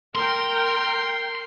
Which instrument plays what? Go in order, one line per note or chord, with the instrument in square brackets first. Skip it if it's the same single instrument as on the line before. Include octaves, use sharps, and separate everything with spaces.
[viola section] A#4 G5 [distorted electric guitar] C6